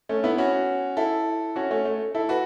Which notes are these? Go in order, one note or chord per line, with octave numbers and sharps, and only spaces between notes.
A3 C#4
B3 E4
C#4 F#4
E4 A4
C#4 F#4
A3 C#4
A3
E4 A4
F#4 B4